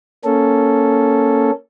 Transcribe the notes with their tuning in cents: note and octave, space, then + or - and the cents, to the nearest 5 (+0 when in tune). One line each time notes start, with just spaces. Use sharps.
A#3 +0 C#4 +0 A4 +0